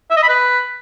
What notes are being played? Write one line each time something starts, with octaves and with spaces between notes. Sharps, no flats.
E5
D#5
B5
B4